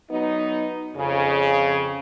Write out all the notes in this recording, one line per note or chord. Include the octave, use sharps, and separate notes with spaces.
F#3 B3 D#4
F2 C#3